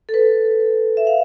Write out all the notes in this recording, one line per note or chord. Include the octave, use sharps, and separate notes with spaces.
A4
B4
E5
F5